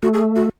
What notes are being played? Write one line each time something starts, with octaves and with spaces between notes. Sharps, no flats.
A3 F#4
G#4
F#4